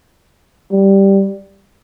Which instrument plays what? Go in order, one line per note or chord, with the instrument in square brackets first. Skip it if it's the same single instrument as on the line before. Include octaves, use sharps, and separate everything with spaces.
[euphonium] G3